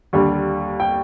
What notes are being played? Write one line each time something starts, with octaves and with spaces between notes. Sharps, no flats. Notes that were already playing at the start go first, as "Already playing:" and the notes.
D#2 D3 G3
G5